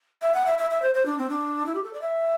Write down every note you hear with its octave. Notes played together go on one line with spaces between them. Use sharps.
E5
F#5
E5
E5
E5
C5
C5
D4
C4
D4
E4
G4
A4
D5
E5